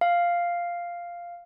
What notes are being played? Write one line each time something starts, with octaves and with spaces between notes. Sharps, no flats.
F5